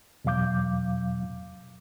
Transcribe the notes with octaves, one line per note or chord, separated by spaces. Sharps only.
E2 B2 F#3 F5 D6 G6